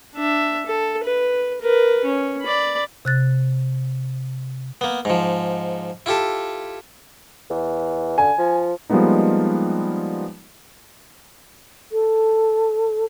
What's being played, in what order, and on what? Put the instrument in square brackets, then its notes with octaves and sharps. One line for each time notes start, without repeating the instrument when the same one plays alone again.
[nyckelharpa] D4 E5
A4
B4
A#4 B4
C#4
D5 B5
[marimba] C3 F#6 A6
[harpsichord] A#3 B3
G#2 F3
E4 F4 G4 A4
[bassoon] E2
[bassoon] D3 [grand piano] G#5
[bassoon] F3
[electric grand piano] F3 G3 G#3 A#3 B3 D#4
[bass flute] A4